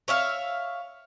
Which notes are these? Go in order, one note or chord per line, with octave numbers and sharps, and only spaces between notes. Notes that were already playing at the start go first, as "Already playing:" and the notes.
C#5 E5 F5